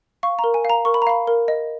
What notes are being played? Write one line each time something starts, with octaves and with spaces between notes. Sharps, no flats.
F5 C#6
A#5
A#4
G#5
F5 A#5
A#4 C#6
B5
A#5
F5 B5
A#4
D#5